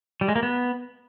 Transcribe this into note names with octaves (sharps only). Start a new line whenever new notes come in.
G3
G#3
A#3
B3